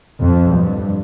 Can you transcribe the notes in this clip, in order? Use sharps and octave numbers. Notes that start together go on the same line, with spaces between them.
F2
G2